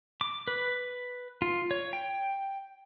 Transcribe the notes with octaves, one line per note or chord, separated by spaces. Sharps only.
D6
B4
F4
C#5
G5